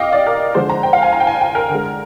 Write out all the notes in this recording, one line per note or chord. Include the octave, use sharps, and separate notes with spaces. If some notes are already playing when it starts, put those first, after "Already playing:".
Already playing: C3 D#5 F5 G5 D6
D5
A#4
D3 F3 G#3 C5
A#5
G5
F5
G#5
A#5
G5
G#5
G5
A#4
D3
G#3